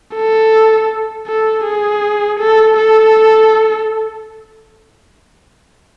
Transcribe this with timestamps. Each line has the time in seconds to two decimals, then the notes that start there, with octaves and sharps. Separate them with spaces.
0.15 A4
1.27 A4
1.65 G#4
2.39 A4
2.76 A4